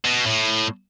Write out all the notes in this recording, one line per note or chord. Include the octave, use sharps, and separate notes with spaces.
B2
A2